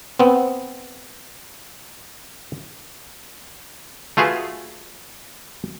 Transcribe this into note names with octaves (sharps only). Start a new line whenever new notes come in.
B3 C4
A3 F4 F#4 G#4 B4